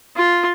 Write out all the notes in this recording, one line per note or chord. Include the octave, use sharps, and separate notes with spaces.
F4